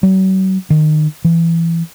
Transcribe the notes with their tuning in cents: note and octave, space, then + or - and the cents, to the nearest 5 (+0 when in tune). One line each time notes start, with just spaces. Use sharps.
F#3 +40
D#3 -25
E3 +20